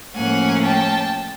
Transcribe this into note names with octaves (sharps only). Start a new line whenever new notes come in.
A2 F3 A#3 C#4 F#5 G#5
G5 A5